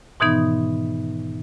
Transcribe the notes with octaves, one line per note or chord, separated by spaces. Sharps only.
G#2 B2 D#3 E3 B3 D#4